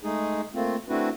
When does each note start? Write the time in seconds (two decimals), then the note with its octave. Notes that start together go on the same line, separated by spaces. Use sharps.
0.04 G#3 A3 D#4 G#4
0.54 A3 A#3 C4 F4
0.89 A3 C4 D4 E4 F#4 B4